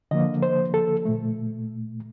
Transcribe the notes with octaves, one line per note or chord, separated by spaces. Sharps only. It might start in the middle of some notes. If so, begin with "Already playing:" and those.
D3 F3 A#3 D#5
C5
A4
A#2 A3